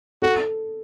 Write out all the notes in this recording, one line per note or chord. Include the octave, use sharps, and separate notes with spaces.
F#4 A4